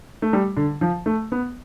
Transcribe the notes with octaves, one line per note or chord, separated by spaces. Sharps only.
A3
G3
D3
F3
A3
B3